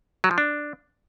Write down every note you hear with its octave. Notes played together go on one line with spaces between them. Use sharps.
F#3
F3
D4